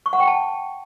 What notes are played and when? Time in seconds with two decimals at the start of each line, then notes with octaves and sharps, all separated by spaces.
0.06 C#6
0.13 F#5
0.20 G5
0.27 A5